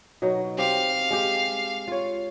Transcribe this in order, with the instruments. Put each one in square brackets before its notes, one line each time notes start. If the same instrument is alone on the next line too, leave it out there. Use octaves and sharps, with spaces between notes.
[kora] B2 F#3 D#4
[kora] C4 G4 [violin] F5
[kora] G#3 G4
F4 C#5